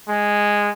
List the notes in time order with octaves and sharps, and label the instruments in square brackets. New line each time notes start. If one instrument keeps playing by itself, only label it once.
[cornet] G#3